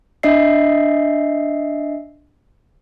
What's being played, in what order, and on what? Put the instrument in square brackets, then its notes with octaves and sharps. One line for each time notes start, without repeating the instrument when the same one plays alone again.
[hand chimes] D4 D#5 E5 C7